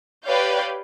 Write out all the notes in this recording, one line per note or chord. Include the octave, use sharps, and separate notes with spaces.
G4 B4 C#5 D5 F5 G6